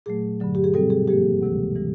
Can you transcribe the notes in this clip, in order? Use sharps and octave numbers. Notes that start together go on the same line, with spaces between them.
A#2 F#3 A3 G#4
G2 D3 F#3
G4
G#4
B2 G3 C4 A4
G#4
G#2 F3 A#3 G4
D2 C3 E3 G#3
C3 E3 G3